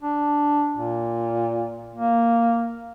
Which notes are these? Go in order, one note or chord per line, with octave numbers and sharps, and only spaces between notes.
D4
A#2
A#3